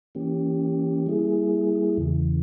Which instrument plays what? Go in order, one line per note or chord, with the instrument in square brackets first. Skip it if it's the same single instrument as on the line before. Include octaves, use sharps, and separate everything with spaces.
[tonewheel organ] E3 A#3 C#4 G4
G3 A#3 E4 G#4
E2 C#3 E3